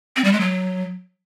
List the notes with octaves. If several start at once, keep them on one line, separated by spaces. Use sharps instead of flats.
C4
G3
G#3
F#3